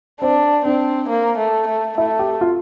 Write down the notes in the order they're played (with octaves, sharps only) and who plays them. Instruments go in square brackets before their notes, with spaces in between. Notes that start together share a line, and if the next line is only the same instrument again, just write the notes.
[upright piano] C4 [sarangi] D4
[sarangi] C4 [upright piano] D4
[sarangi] A#3
A3
A3
[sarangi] A3 [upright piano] E4
[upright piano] G4
F4